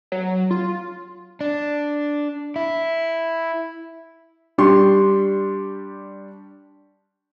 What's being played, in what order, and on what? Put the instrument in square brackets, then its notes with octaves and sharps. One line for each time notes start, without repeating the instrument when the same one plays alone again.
[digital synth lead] F#3
F4
[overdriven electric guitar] D4
E4
[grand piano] G3 D4 G4 C6 C#6